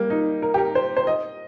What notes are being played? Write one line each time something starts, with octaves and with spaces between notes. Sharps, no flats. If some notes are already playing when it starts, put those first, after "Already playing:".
Already playing: G3 A#3
D#4
A#4
G4
A#4
C5
C5
D#5